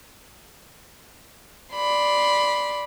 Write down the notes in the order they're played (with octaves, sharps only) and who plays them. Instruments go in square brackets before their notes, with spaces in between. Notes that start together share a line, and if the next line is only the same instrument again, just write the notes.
[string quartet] D5 B5 C6